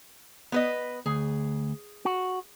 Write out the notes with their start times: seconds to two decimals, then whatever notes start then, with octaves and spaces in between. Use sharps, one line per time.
0.52 B3 B4 D#5
1.06 D2 G#4
2.05 F#4